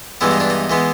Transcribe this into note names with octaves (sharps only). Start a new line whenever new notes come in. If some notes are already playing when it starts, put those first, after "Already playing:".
G2 E3 G#3 B3 E4
D#4
D4
D#4
E3 G#3 B3